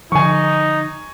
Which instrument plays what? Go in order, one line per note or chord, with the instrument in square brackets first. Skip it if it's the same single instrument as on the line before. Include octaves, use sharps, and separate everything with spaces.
[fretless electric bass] D3 F3 [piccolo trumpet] D#4 [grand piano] G#5 C#6